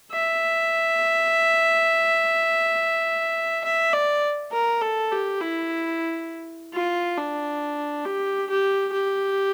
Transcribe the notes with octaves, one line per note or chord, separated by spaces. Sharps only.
E5
E5
D5
A#4
A4
G4
E4
F4
D4
G4
G4
G4